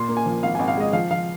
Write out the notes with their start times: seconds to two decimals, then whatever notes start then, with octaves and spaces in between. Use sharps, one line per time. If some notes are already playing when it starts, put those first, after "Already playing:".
Already playing: A#2 C6
0.09 A#3
0.17 G#5
0.26 F3
0.43 G#1 F5
0.55 G#1 G#5
0.68 F5
0.77 G#3 D#5
0.93 F3 F5
1.11 F3 F5